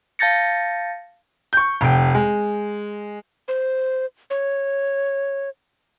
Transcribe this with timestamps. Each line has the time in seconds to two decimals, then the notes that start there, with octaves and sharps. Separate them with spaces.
0.19 F5 A5 G6 A6 A#6 C#7
1.53 C#6 G6
1.81 F1 G5
2.15 G#3
3.48 C5
4.30 C#5